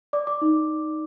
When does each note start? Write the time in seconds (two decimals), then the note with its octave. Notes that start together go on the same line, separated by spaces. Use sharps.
0.13 D5 D6
0.27 D6
0.42 D#4